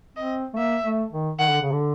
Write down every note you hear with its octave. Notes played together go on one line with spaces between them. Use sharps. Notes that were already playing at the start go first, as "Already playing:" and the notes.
C4 D#5
A3
A#3 E5
A3
D#3
D#3 F#5
D3
C#3
D3